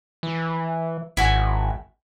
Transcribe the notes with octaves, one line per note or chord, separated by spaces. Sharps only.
E3
G#1 E4 F#4 G#5